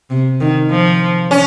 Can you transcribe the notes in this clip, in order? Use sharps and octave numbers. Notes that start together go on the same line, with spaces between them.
C3
D#3
F3
C#4